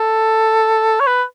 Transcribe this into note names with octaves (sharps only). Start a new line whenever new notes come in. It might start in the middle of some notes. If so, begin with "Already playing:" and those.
Already playing: A4
C#5
B4